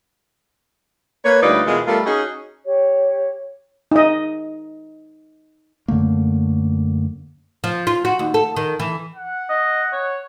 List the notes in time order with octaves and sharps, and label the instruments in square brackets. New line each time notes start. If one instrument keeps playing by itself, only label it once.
[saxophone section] A#3 B4 C#5
D2 G3 D#4 F4 B4 D5
B2 E3 G#3 F4 G#4 A#4
G3 A3 F4 A4 A#4
C#4 D#4 F#4 G#4
[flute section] G4 C#5
[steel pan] D#4 D#5
[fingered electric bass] F#2 D3 A3 A#3
[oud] F3
F4
F#4
D#2
A4
D#3
E3
[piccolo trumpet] F#5
[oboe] D#5
C#5